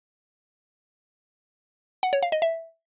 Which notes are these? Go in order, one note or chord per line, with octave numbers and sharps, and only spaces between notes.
F#5
C#5
F5
D#5
E5